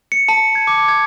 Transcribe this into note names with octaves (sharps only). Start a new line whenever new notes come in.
C#7
A5
G#6
D6
G#6